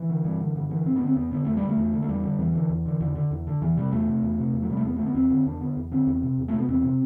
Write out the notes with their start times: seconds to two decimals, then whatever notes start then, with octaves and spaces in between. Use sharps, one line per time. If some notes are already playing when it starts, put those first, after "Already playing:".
Already playing: E3
0.09 D3
0.25 G2
0.40 D3
0.55 G2 D3
0.70 D3 E3
0.85 G2 C4
0.96 D3 B3
1.06 C4
1.16 E2 B3
1.31 D3 B3
1.45 E2 A3
1.57 G3
1.62 D3
1.69 A3
1.77 E2
1.93 D3
2.02 A3
2.09 E2 G3
2.24 D3
2.38 E2 E3
2.54 D3
2.70 E2
2.86 D3
3.00 E2 D3
3.15 D3
3.31 E2
3.47 D3
3.61 E2 E3
3.77 C3 G3
3.92 E2 A3
4.07 C3
4.23 E2
4.39 C3
4.54 E2
4.62 F#3
4.69 C3 G3
4.77 A3
4.84 E2 B3
4.96 D3 A3
5.06 B3
5.15 E2 C4
5.31 D3
5.46 E2 D4
5.60 D3 B3
5.77 E2
5.91 D3 C4
6.07 E2
6.23 C3
6.38 E2
6.48 C3 A3
6.59 B3
6.68 E2 C4
6.84 C3